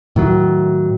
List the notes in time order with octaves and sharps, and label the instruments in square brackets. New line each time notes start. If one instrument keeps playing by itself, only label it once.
[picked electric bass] A2 D#3 F#3